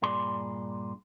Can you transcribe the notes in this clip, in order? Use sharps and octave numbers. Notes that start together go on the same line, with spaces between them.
G2 A#2 G#4 D5 C6